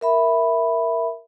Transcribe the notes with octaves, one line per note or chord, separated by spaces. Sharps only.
A#4 E5 B5